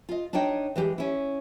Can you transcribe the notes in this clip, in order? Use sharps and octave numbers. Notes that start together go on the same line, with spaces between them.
F4 D#5
D4 D#4 C#5 D#5 G5
E3 G#3 G4
C#4 E4